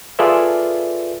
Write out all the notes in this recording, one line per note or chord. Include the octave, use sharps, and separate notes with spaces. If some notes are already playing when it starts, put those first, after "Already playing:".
F4 G#4 A4 B4 D5 E5